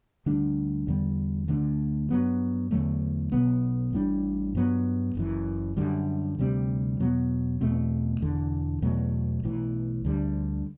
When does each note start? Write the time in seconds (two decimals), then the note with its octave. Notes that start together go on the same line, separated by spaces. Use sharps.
0.26 D2 D3 G3 D4
0.88 E2 D3 G3
1.48 D2 D3 A3 D4
2.10 G2 F#3 B3
2.71 E2 D3 F#3 A3
3.32 B1 B2 F#3 B3
3.93 A1 A2 G3 D4
4.55 G2 F#3 B3
5.15 F#1 F#2 E3
5.77 F#2 D3 G3
6.38 D2 C3 G3 C4
6.99 E2 B2 F#3 B3
7.61 E2 B2 A3 C4
8.21 E1 E2 D3
8.82 E2 B2 F#3 A3
9.43 B1 A2 E3
10.04 D2 D3 G3